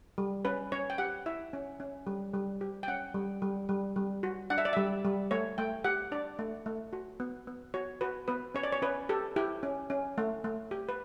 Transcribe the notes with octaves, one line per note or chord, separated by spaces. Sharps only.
G3
C#4 B4
C#4 C#5
G5
G4 F#5
E4 E5
C#4
C#4
G3
G3
G4
G5
C#4 F#5
G3
G3
G3
G3
F#4
D4 F#5
E5
D5
G3 E5
G3
A3 C#5
A3 G5
G4 F#5
D4 D5
A3
A3
F#4
B3
B3
F#4 C#5
F#4 B4
B3 B4
C#4 C#5
D5
C#5
C#4 B4
G4 A4
E4 G4
C#4
C#4
A3
A3
G4
B4